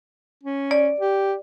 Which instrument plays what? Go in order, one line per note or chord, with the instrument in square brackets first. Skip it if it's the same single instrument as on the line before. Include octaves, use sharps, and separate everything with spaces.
[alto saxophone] C#4
[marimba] D5
[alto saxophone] G4